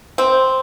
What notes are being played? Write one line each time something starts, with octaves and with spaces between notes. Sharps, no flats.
C4